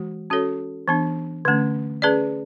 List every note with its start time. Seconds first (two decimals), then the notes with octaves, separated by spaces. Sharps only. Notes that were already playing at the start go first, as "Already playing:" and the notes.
Already playing: E3 G#3 F#4
0.30 C#4 F#4 A4 C#5
0.88 E3 B3 D4
1.45 D3 A3 C#4
2.02 C#4 G#4 B4 D5